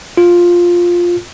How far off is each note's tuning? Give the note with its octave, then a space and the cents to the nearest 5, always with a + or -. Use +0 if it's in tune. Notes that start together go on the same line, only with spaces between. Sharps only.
F4 +5